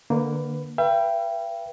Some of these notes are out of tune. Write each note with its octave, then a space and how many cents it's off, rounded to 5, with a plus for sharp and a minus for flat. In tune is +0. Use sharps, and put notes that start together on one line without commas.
D3 +10 A#3 +0 B4 +15
B4 -15 E5 +45 G5 +0